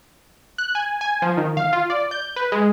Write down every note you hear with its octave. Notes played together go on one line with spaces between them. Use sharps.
F#6
G#5
G#5
F3
D#3
F5
F4
D5
G6
B4
G#3